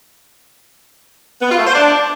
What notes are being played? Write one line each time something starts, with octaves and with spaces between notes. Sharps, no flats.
B3
F4
A3
C5
D4